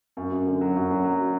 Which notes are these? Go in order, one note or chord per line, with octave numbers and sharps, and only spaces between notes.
F#2
F#2
D3
F#3
F#2
F#3
F#3